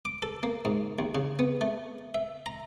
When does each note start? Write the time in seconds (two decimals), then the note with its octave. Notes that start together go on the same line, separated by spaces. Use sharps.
0.05 D6
0.22 A4
0.43 A#3
0.65 G#2
0.99 D#2
1.15 C#3
1.39 B3
1.61 A3
2.14 E5
2.46 A#5